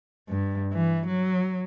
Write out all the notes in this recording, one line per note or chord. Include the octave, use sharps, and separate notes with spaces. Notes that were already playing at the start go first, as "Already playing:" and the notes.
G2
E3
F#3